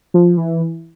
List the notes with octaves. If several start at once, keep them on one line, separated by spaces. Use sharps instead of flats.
F3
E3